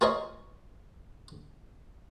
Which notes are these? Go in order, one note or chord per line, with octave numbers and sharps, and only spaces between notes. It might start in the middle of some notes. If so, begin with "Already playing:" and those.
F4 G#4 A#4 C5 C#5 D#5